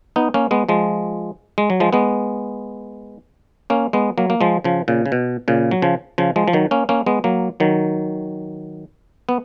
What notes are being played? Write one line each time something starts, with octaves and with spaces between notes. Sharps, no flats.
B3 D#4
A#3 C#4
G#3 B3
F3 G#3
G#3
F#3
F3 G#3
G#3 B3
A#3 C#4
G#3 B3
F#3 A#3
A#3
F3 G#3
C#3 F3
A#2 C#3
C#3
B2
A#2 C#3
F#3
C#3 F3
C#3 F3
F3 G#3
F3
D#3 F#3
A#3 C#4
A#3 C#4
G#3 B3
F#3 A#3
D#3 F#3
B3